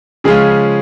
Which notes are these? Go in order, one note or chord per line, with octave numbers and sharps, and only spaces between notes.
C#3 F3 G#3 C#4 F4 G#4